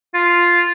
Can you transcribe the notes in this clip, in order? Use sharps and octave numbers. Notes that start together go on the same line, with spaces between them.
F4